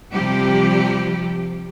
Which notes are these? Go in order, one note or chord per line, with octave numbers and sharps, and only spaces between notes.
C3 F3 G3 G4